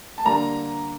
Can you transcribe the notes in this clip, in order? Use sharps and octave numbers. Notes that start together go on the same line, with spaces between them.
A5
D3 G3 A#3 A#5